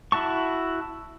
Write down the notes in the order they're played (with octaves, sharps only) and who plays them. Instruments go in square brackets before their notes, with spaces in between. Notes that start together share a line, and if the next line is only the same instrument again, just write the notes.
[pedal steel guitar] E4 F#4 A5 C#6